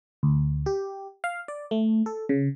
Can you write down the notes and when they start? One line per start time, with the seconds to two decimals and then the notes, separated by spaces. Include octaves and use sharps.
0.23 D2
0.66 G4
1.24 F5
1.48 D5
1.71 A3
2.06 A4
2.29 C#3